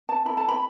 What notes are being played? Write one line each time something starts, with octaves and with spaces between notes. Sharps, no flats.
A5
E4 A4 B5
A5
B5